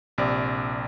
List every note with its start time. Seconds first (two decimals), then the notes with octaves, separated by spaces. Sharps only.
0.18 A#1 C3 D5